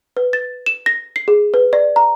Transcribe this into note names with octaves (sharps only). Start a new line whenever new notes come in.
B4
A6
E7
A#6
C7
G#4
B4
D5
A#5